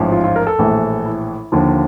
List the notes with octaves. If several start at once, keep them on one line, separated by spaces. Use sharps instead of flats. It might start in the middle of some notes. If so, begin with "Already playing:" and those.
Already playing: A1 G#2 F3
F4
F4
A#4
A4
A#1 A2 E3
E4
D#2 D3 F3